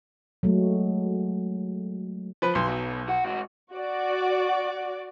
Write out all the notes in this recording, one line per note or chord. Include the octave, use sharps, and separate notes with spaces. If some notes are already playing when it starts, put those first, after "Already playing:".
F#3 G#3 A3
F3 B4
B1 C6
B2 F#3
F#4 F#5
G#2 F#4
F#4 D5